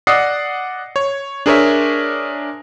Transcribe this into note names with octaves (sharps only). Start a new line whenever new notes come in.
D5 D#5 F#5 D#6 E6 C7
C#5
D4 G#4 A#4 C5 C#5 E5